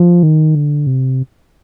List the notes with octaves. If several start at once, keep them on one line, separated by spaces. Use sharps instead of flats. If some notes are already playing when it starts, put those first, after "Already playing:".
Already playing: F3
D#3
D3
C3